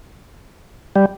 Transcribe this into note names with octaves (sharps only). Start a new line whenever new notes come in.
G3